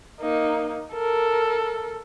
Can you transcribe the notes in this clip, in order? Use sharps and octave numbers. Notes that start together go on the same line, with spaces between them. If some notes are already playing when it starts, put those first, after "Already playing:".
A#3 D#4
A4 A#4